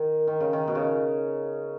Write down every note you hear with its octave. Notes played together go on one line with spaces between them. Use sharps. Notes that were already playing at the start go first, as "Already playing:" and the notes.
Already playing: D#3
D#3
C#3
D#3
B2
C#3